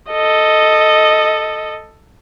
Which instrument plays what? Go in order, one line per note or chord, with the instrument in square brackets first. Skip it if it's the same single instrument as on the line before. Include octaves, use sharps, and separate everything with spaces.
[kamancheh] A4 D#5